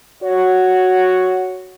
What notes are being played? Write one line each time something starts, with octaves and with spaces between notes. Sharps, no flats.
F#4 C#5